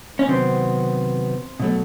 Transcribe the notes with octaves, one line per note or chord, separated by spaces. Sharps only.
C#4
C3 D#3 F#3 B3 C4
B2 F#3 A3